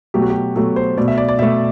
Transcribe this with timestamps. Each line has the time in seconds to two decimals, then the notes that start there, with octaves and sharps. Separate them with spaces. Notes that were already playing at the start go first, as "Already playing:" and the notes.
0.14 B2 F#3 A3 G4
0.22 F#4
0.30 G4
0.55 B2 F#3 A3 A4
0.76 C5
0.97 B2 A3 D5
1.08 E5
1.18 D5
1.29 D5
1.39 B2 A3 E5